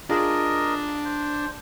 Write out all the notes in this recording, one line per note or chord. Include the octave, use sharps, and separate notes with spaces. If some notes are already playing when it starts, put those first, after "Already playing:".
D4 F4 G#4 A#4 D#5
C5